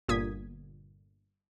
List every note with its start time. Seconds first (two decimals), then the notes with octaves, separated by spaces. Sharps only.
0.08 G1 A#2 D#6 G#6 B6